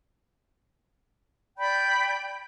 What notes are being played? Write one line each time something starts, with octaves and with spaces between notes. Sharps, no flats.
D5 G5 B5 G6